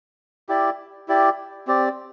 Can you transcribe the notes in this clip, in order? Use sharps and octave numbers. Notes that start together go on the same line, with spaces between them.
E4 G4 D5
E4 G4 D5
C4 G4 D5